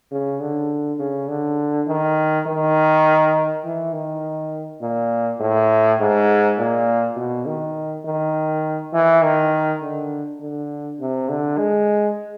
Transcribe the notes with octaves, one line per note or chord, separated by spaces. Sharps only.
C#3
D3
C#3
D3
D#3
D#3
E3
D#3
A#2
A2
G#2
A#2
B2
D#3
D#3
E3
D#3
D3
D3
C3
D3
G#3